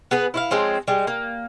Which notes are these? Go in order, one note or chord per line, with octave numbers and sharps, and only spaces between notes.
B3 G#4 B4
E4 F4 F5
F3 G#3 C4 C#4
G3 G#3
A#3